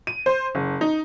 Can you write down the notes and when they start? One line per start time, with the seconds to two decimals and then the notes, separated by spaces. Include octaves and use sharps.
0.07 D#7
0.26 C5
0.55 F#1
0.81 D#4